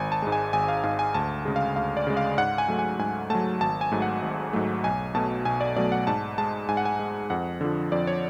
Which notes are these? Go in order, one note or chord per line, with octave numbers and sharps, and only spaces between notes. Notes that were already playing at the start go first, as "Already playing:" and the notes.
Already playing: G#1 G#5
A5
G#2 G#3
G#5
G#1 G#5
F5
G#2 G#3 F5
G#5
D2 A5
C#3 G#3
F5
D2 F5
D5
C#3 G#3
F5
G#2 F#5
G#5
F#3 A3
G#5
G#2 G#5
F#3 A3 A5
G#1 A5
G#5
G#2 F#3 A3
F#5
G#1
G#2 F#3 A3
B1 G#5
B2 F#3 A3 A5
B1 G#5
D5
B2 F#3 A3 D5
F#5
G#2 A5
G#3 A5
G#2 G#5
F#5
G#5
G#3
F2 F#5
D3 F3
F2 D5
C#5